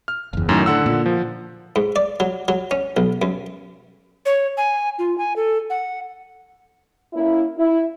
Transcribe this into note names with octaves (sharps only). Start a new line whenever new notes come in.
F6
F#1 E2
F#2 A2 D#3
D3 F#5 E6
A#2
F3
G#2
D5
F#3
F#3
C#4
B1
F#2
C#5
G#5
F4
G#5
A4
F#5
A#3 C#4 E4
E4